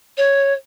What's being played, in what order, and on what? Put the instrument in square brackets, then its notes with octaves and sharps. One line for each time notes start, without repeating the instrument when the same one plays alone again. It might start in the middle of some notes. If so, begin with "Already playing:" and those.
[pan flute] C#5